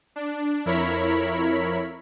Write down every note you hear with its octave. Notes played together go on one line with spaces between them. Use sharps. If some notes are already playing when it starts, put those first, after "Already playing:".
D4
F2 E4 A#4 C#5 B5 B6